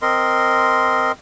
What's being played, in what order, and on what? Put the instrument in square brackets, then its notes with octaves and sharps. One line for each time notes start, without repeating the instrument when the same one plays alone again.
[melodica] C4 A#4 D#5 C6